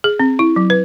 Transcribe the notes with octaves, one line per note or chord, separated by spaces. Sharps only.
G#4
C4
E4
F#3
B4